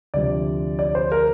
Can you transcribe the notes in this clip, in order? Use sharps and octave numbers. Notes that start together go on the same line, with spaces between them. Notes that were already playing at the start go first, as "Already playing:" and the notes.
D2 C3 F3 D5
D5
C5
A#4